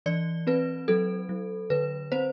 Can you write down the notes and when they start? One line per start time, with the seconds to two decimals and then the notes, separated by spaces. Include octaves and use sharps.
0.06 E3 D5
0.47 C4 B4
0.88 F#3 A4
1.29 F#3
1.70 D3 B4
2.12 C4 C5